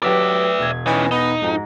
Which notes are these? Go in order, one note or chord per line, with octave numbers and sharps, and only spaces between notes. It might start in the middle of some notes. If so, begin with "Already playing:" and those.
F#3 G4 B4 D5 E5 G5
E1 G#6
E3 C#4 D#4 G#5
B3 D#4
F2 G#2 F#4 A#5